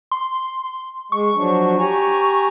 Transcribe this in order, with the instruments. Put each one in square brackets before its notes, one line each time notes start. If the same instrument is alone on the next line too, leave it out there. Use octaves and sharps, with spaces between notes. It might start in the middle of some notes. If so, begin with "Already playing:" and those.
[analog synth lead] C6
[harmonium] G#3 [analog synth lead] C#6
[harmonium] F3 F#3 D4
G4 G#5 A#5